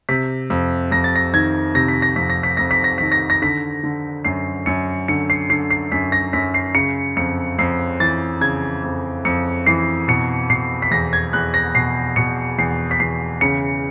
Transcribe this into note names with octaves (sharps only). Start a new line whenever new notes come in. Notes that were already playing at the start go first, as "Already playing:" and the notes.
C3 B6
F2
F2 A#6
A6
A#6
D#3 G#6
C3 A#6
B6
A#6
F2 B6
A#6
B6
F2 A#6
B6
A#6
D#3 B6
A#6
A#6
D3 B6
D3
F#2 C7
F#2 C#7
D3 C#7
C7
D3 C7
C7
F#2 B6
A#6
F#2 B6
C7
C#3 C#7
F2 C#7
F2 C7
E3 A6
C#3 G#6
F2
F2 C#7
E3 C7
B2 C#7
B2 C7
B6
E2 A#6
G#6
E2 F#6
A#6
B2 C7
B2 C#7
E2 C7
B6
E2 C7
C#3 C#7